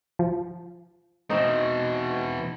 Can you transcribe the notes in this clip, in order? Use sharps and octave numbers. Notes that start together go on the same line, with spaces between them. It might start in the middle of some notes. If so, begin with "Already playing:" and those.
F3
B2 E3 C4 D#4